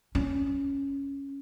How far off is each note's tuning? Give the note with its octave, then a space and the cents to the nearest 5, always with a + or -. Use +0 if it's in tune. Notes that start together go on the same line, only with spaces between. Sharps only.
C#4 +0